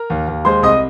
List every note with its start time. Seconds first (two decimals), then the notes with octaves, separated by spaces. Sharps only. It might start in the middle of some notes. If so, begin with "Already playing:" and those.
Already playing: A#4 A#5
0.10 D#2
0.28 D#2
0.45 G#3 C5 C6
0.63 C2 D#5 D#6